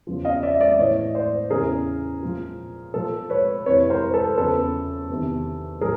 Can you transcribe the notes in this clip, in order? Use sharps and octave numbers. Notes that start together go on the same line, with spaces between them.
E2 C#3 F3
D#5 F5
D5 E5
D5 E5
A2 E3 C#5 D#5
C5 D5
E2 C#3 E3 G#4 A#4
A#2 F3
A#2 F3 A4
B4 C#5
F2 C3 E3 B4 C#5
A#4 C5
A4 B4
E2 C#3 F3 A4 B4
E2 C3 D#3
A2 F3 G#4 A#4